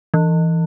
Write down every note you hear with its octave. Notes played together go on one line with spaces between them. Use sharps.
E3